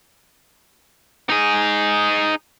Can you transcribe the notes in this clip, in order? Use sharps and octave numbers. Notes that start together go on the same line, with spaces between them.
D#4 G#4